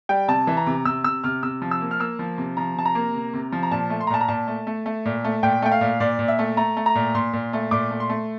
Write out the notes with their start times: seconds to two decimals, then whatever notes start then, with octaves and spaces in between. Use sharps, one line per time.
0.09 G3 G5
0.28 C3 A5
0.47 E3
0.57 A#5
0.67 C3
0.85 C3 E6
1.04 C3 E6
1.24 C3 F6
1.43 C3 E6
1.62 F3
1.71 E6
1.81 A#3
1.91 F6
1.99 A#3 E6
2.19 F3
2.38 C3
2.57 F3 A#5
2.76 C3 A5
2.85 A#5
2.95 A#3
3.14 C3
3.34 C3
3.52 F3
3.63 A#5
3.71 A#2 A5
3.90 A3
4.00 C6
4.07 A#5
4.10 A#2 A5
4.21 A#5
4.28 A#2 A5
4.48 A3
4.67 A3
4.86 A3
5.05 A#2
5.24 A3
5.43 A#2 G5
5.62 A3 G5
5.72 F5
5.81 A#2
6.00 A#2 D5
6.19 A#2
6.28 E5
6.39 A3
6.57 A3 A#5
6.77 A3
6.86 A#5
6.95 A#2
7.15 A#2 C6
7.33 A#2
7.53 A3
7.71 A#2 D6
7.91 A3
8.00 C6
8.09 A3